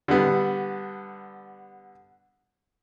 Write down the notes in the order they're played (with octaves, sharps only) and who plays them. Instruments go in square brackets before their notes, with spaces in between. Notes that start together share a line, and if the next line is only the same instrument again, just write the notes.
[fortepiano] D3 G3 B3